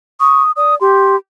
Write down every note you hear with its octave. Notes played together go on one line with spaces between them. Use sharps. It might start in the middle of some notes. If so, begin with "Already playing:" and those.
C#6 D#6
D5 D#6
G4 C6